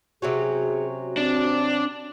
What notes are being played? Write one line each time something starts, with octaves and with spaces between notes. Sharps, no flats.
C3 F#3 C#4 F#4 G#4
C4 D4